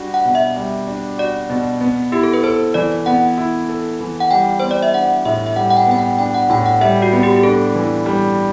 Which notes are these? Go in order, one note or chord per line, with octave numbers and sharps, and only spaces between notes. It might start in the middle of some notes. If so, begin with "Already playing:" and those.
Already playing: G3 D4 F#4
F#5
B2
E5
G3
D4
F#4 D5
B2
B3
E4 G4
A4
B4
A4 C5
E3 D5
B3 F#5
E4
A4
E3
F#5
G3 G5
B3 C5
D5
E5
D4 F#5
A2 E5
E5
G3 F#5
F#5
G5
B3 G5
F#5
D4 G5
F#5
A2 G5
F#5
G3 E5
F#4
B3
G4
G4
D4 A4
E3
G3